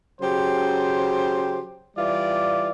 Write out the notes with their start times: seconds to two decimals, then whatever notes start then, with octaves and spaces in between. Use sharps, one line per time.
0.21 C#3 F#3 G4 C5
1.97 E3 G3 E4 F4 D5